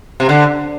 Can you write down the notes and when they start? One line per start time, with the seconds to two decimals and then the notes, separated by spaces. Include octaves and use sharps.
0.20 C3
0.29 D3